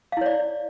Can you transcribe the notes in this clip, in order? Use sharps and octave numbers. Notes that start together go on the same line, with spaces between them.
E4 C#5 D5 F5